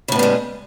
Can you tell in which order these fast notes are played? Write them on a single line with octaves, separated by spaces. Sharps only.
C#3 A2 B3 G3 G#3